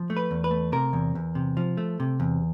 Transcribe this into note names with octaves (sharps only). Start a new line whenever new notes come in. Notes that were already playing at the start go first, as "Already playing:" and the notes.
Already playing: F3
A3
B4
E2
B4
A3
C3 A#4
E2
E2
C3
F3
A3
C3
E2